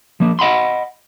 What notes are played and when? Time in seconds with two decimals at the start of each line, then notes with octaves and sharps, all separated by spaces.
0.20 F3 A#3
0.39 D#5 F#5 B5 C6